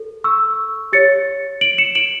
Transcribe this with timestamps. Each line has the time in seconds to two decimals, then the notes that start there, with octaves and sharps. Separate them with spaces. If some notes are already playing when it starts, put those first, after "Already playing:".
Already playing: A4
0.24 C#6 E6
0.93 G4 C#5 A6 C#7
1.61 D7 F#7
1.78 C#7 E7
1.95 D7 F#7